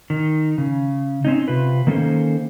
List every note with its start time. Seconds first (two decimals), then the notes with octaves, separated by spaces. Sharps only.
0.10 D#3
0.58 C#3
1.25 C4 C#4 D#4
1.48 C3 F4 B4
1.87 D#3 A#3 C#4 A4 C5